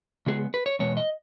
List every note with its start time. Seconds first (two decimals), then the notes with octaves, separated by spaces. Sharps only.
0.26 C#3 G#3 B3 G#4
0.54 B4
0.66 C#5
0.79 E2 B2 G#3 B3 C#5
0.97 D#5